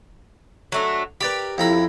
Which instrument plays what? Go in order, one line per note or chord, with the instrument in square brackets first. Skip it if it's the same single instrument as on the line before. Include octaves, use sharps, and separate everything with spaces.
[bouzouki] F#3 A3 D4
[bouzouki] G4 A#4 [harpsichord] B4 D5 B5
[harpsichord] F2 A#5 B5 [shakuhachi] E4